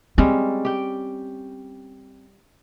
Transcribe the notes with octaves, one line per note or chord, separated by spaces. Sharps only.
G3 G#3 C4 C#4
G4 G5